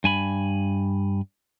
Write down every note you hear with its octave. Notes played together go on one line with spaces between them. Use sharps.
G2 G#5 B5